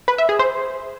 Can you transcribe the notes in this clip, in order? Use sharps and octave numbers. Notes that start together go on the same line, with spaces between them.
B4
E5
G#4
C5